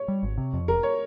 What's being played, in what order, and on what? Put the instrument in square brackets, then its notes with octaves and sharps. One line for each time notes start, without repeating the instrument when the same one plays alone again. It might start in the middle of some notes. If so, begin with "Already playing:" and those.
Already playing: [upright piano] C#5
[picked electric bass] G3
G#1
C3
F2
[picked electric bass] F1 [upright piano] A#4
[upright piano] C#5